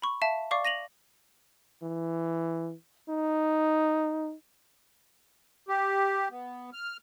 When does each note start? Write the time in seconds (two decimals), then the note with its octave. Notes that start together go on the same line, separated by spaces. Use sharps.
0.02 B5 C#6
0.22 E5 F5 A5
0.51 D5 F5 C#6 D6
0.65 A#6 D#7 F7 F#7
1.83 E3
3.09 D#4
5.69 G4
6.30 B3
6.73 F6